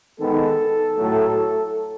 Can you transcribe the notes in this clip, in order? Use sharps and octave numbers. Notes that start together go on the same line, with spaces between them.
D#3 G#3 B3 A4
A2 F#3 A3